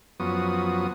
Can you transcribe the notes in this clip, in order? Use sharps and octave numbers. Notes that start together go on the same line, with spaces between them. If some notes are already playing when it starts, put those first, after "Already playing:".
F#2 F3 B3 F#4 D#6